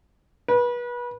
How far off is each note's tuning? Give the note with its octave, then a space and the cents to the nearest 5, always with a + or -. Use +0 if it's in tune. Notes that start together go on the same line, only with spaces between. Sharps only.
B4 -30